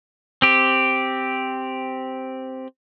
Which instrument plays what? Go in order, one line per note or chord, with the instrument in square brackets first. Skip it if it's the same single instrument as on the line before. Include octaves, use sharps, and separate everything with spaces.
[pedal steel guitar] C4 G4